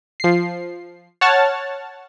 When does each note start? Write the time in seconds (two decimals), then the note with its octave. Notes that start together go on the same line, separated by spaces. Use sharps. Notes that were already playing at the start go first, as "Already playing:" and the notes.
0.20 F3 C7
1.21 C#5 F#5 A5 F6 A6